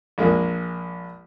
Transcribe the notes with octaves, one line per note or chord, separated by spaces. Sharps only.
A#1 G#3 A#3